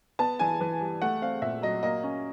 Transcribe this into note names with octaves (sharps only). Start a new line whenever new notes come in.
B3 A5
E3 G#5
E3
G3
A3 F#5
C4 F5
A#2 E5
F#3 D#5
A#3 D#5
C#4